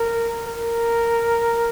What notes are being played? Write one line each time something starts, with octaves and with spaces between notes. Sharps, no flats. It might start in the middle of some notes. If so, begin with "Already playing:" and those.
Already playing: A#4
A#4